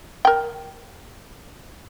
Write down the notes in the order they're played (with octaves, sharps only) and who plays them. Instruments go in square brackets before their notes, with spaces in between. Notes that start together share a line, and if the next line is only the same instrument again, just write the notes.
[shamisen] A#4 G5